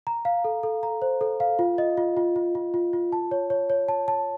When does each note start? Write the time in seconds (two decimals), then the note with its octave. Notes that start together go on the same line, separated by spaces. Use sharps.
0.07 A#5
0.25 F5
0.44 A4
0.63 A4
0.83 A#5
1.02 C5
1.21 A4
1.40 F5
1.59 F4
1.78 D#5
1.97 F4
2.17 F4
2.36 F4
2.55 F4
2.74 F4
2.93 F4
3.12 A5
3.31 C#5
3.50 C#5
3.70 C#5
3.89 A5
4.08 A5